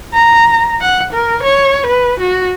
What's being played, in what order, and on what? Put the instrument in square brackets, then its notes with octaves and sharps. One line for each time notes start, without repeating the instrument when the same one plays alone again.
[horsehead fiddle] A#5
F#5
A#4
C#5
B4
F#4